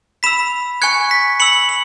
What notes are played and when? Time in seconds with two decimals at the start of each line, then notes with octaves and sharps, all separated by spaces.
0.23 B5 E6 B6 E7
0.82 G#5 C#6 F#6 G#6 C#7
1.11 B6
1.40 B5 E6 C#7 F#7
1.69 F#7